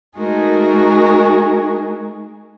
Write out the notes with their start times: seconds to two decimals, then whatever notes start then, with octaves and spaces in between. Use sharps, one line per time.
0.17 G#3 A3 D#4 F#4 G#4 A#4